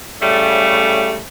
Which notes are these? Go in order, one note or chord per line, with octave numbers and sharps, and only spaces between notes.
A2 C#3 G3 A3